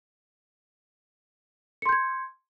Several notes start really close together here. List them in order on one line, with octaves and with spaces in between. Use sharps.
C#7 C6 G6 G#6